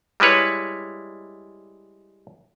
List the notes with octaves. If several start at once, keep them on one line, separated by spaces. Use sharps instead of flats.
G3 G#3 E4 B4 C#5